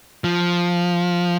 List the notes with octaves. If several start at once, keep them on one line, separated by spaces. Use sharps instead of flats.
F3